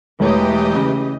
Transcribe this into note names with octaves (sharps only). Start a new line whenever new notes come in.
E1 E3 A3 G4 C#5 D#5
C#3